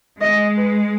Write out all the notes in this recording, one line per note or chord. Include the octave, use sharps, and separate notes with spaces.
G#3 D#5
B4